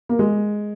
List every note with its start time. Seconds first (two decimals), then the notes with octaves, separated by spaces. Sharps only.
0.09 A#3
0.19 G#3